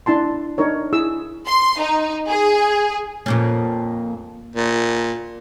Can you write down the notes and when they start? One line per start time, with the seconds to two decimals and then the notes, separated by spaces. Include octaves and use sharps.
0.06 D4 E4 A5 C6
0.58 D4 D#4 A#4 C#5
0.93 E4 G#4 E6
1.46 C6
1.80 D#4
2.29 G#4
3.26 F2 A#2 C#4
4.56 A#2